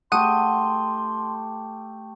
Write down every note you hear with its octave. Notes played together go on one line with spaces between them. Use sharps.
A3 G4 F#5 C6 D#6 D#7